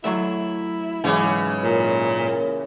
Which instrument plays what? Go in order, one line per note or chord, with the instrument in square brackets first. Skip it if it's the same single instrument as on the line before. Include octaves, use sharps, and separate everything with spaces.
[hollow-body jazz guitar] F#3 A3 E5 [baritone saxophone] E4
[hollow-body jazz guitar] G#2 F#3 [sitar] C#3 E3
[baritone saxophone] A#2 [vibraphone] A#4 C#5